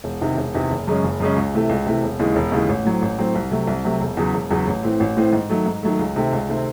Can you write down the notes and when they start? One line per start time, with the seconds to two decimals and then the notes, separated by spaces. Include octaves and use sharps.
0.04 E1
0.21 E2 C3 D#3
0.37 E1
0.54 E2 C3 D#3
0.71 F#1
0.87 F#2 C#3 G#3 C#4
1.04 F#1
1.20 F#2 C#3 G#3 C#4
1.36 C#2
1.54 C3 E3 A3
1.69 C#2
1.86 C3 E3 A3
2.03 E1
2.19 D#2 C#3 E3 G#3
2.36 E1
2.52 D#2 C#3 E3 G#3
2.69 A1
2.85 A2 F#3 C4
3.02 A1
3.18 A2 F#3 C4
3.35 C2
3.51 C3 F#3 A3
3.67 C2
3.84 C3 F#3 A3
4.01 E1
4.17 E2 C#3 F#3
4.34 E1
4.50 E2 C#3 F#3
4.67 A1
4.83 A2 E3 C4
5.00 A1
5.17 A2 E3 C4
5.33 G#2
5.50 D#3 F#3 A3
5.66 G#2
5.83 D#3 F#3 A3
5.99 C#2
6.16 C3 D#3 A3 C4
6.33 C#2
6.49 C3 D#3 A3 C4